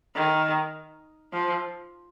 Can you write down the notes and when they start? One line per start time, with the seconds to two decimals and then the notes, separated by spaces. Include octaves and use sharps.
0.16 D#3
1.33 F3